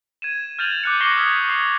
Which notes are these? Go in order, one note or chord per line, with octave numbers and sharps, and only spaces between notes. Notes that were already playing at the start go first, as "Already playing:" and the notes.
G#6 D#7 E7
F6 G6 A6 D#7 F7 F#7
D6 F#6 C#7
C#6 D6 A#6 C7 C#7 G7
D#6 F6 G#6 B6 C#7
D#6 C7 C#7 F7